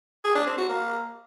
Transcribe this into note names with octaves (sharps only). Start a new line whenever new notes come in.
G#4
D4
C4
F#4
A#3